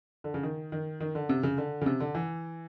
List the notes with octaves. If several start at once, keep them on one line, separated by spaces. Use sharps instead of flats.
D3
C#3
D#3
D#3
D#3
D3
C3
C#3
D3
C#3
C3
D3
E3